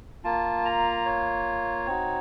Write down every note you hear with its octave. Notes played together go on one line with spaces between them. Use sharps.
A#3 F4 A5
A#5
C#5
C4 D#4 F#4